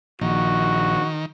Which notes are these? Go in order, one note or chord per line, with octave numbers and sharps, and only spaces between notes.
A#1 D#3 F#4